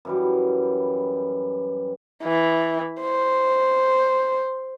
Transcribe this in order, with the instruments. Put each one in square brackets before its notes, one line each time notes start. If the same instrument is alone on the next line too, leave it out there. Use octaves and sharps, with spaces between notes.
[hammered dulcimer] F#2 E3 G3
[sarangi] E3
C5